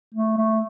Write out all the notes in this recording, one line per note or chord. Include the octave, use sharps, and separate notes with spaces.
A3
A3